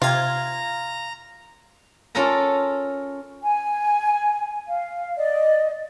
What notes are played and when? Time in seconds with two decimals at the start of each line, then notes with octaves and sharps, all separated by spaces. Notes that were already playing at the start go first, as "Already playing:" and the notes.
0.02 C3 F4 A#5 G#6
2.15 C#4 F4 A4 A#4 A#5
3.42 G#5
4.68 F5
5.17 D5 D#5